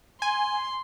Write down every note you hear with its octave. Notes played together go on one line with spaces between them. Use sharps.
G#5 C6